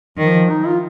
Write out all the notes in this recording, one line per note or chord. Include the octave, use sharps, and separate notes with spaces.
D#3 F3
D#4
F4